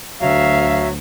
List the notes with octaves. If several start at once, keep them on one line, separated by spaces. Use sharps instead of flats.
D2 F#3 E5 F5